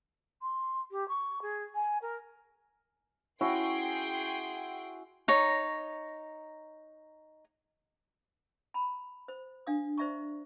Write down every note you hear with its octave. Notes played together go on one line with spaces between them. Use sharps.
C6
G4
C#6
G#4
G#5
A#4
C#4 E4 F#4 G#4 G5 C6
D#4 C#5 A#5
A#5 B5
C5
D4 F5 D#6
C5 D5 E5 A#5 C#6